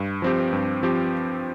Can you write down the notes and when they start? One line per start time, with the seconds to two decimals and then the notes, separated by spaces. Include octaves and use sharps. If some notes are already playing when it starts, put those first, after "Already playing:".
Already playing: G2
0.22 F3 C4 G4
0.53 G2
0.83 F3 C4 G4